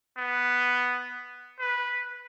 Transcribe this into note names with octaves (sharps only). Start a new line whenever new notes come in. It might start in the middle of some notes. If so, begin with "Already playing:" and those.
B3
B4